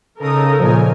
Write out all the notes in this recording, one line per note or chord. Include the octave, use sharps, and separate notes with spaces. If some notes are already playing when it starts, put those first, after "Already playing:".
C#3 D#4 A4 A#4 D#6
A#2 C#3 F3 G#5